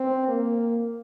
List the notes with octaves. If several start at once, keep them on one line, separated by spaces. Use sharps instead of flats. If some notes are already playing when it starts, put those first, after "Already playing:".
Already playing: C4
A#3